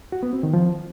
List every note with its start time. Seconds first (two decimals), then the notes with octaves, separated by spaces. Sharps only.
0.12 F#4
0.23 B3
0.33 C4
0.43 D#3
0.53 F3